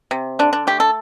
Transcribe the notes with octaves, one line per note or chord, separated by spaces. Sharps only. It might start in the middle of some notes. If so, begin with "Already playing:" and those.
C3
D3 D4
D4
A3 G4
A4